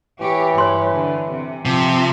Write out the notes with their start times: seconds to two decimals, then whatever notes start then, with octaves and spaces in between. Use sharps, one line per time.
0.21 E3 G4 C#5
0.58 G2 C#5 C6
0.93 D3
1.29 C3
1.65 C3 F3